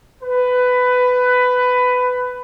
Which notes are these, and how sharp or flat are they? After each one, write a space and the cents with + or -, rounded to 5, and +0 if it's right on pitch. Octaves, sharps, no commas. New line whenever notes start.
B4 +15